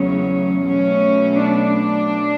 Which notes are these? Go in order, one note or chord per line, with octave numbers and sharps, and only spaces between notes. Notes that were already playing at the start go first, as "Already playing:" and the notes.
Already playing: E2 C#3 F#3 A3 C#4
B2 F#3 A3 C#4
D4